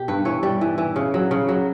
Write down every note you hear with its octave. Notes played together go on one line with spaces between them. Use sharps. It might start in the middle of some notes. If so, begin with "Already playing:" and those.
Already playing: B2 G4
G2 B4
E3 C#5
G3 D5
E3
E3
C#3
F#3
C#3
F#3